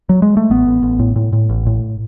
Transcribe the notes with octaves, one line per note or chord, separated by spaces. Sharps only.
F#3
G#3
A3
A1 B3
A1
A1
A2
A2
A2
A1
A2